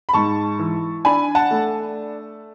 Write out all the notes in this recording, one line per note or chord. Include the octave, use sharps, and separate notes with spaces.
B5
G#2 A5 C#6
E3
D4 G#5 B5
F#5 A5
A3